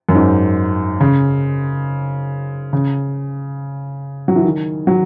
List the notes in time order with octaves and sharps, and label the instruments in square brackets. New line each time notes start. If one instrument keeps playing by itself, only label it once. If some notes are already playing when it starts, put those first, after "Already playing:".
[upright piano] F#2
G#2
C#3
C#3
F#3
E3
D#3
F#3